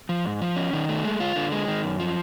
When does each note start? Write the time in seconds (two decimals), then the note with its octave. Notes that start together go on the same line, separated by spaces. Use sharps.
0.09 F3
0.25 G#2
0.41 F3
0.56 C#4
0.73 D#3
0.89 A3
1.05 G#3
1.20 F4
1.36 D3
1.52 G#3
1.68 D#3
1.84 F#2
2.00 F3